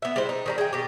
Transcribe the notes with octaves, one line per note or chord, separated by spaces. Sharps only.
B3 E5
G3 G#3 E4 C5
D#4
D#3 G3 A#5
G#4 G5
B2 G4